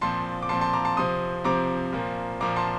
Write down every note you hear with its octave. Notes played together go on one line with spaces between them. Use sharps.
A#2 F3 C4 A5 C6
D6
A#2 F3 C4 A5 C6
A5 C6
A#5 D6
A5 C6
C3 F3 C4 C6 D#6
C3 F3 C4 A#5 D6
A#2 F3 A#3
A#2 F3 A#3 A#5 D6
A5 C6